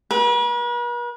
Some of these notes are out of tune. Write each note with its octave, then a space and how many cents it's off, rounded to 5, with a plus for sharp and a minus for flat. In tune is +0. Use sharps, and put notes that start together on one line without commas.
B4 -45